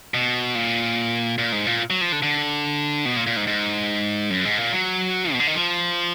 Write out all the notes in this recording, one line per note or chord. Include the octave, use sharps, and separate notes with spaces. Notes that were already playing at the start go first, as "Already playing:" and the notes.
B2
A#2
A#2
G#2
A#2
F#3
F3
D3
D3
B2
A#2
A#2
G#2
G#2
F#2
G#2
A#2
F#3
B2
D3
D#3
F3